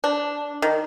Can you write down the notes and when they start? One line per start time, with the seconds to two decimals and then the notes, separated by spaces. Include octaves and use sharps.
0.04 D4
0.62 D#3